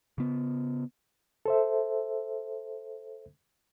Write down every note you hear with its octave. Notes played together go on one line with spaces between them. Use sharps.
C#3 B3
A4 C5 E5